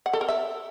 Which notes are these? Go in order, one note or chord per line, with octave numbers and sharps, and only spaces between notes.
F#5
A4
A#4
E5